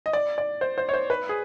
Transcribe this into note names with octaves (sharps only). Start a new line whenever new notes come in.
D#5
D5
D5
C5
C5
C#5
C5
B4
G#4